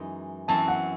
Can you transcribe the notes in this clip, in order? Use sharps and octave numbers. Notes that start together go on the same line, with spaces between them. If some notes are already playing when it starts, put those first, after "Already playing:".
Already playing: F#2 E3 G#3 D#4
F#2 E3 C4 A5
F#5